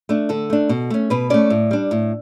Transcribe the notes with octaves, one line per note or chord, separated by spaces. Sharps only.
A3 D4
D3 A4
A3 D4
B2
A3 C#4
B2 B4
A3 C#4 D5
A2
G3 D4
A2